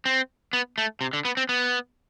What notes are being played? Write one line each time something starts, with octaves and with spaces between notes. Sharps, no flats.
C4
B3
A3
C3
D3
B3
C4
B3